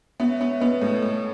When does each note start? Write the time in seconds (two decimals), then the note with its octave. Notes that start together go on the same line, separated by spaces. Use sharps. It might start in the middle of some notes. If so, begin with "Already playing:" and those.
0.20 B3 C#5 E5
0.40 B3 C#5 E5
0.61 B3 B4 D#5
0.81 A2 A4 C#5
1.02 A2